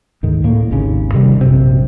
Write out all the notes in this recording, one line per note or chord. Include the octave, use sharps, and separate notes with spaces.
D2 G#2 D#3
A2 A#3
G#1 D#2 C#3
C3 D#3 G3
A#1 F#2 C3